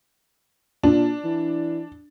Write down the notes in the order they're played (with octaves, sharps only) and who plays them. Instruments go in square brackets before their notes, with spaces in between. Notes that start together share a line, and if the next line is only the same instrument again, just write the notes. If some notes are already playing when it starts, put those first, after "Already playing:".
[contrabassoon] A#2 [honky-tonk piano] D4
[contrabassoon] E3